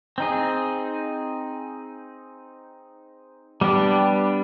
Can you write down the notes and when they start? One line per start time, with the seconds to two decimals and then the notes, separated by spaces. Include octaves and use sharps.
0.18 C4 D#4 G#4
3.61 G3 B3 D4 G4